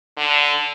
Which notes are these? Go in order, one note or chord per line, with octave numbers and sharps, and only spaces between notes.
D3